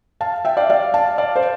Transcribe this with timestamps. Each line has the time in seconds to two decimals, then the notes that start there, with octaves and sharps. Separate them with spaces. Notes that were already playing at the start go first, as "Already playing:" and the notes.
0.21 F5 A5
0.45 E5 G5
0.57 D5 F5
0.69 D5 F5
0.94 F5 A5
1.18 D5 F5
1.36 C5